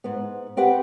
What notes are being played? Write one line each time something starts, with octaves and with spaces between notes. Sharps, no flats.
G#2 B3
C4 G4 B4 F#5